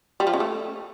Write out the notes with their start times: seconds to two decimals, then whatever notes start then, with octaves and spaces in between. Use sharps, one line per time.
0.20 G3
0.27 F3
0.34 C#3
0.40 A3